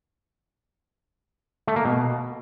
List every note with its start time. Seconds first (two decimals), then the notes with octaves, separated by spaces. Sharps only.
1.67 A3
1.76 A#3
1.85 B2